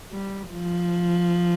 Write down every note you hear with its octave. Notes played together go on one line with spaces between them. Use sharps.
G3
F3